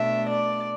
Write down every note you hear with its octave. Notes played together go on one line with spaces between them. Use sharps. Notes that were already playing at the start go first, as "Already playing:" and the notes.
Already playing: B2 A3 D4 E5
D5